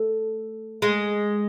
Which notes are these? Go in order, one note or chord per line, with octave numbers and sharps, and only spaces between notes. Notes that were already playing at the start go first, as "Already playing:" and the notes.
Already playing: A3
G#3